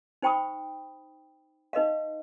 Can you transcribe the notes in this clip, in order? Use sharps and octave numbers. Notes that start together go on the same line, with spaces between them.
D#4 C5 G5 B5 C#6 D#6
D#4 B4 D#5 F5